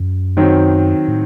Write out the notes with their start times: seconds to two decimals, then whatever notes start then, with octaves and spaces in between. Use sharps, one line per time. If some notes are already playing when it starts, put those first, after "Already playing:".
Already playing: F#2
0.37 D#3 F#3 C4
1.08 A2